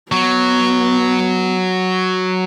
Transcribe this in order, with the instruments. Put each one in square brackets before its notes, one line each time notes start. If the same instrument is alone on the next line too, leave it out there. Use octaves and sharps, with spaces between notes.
[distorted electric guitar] F#3 [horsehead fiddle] B3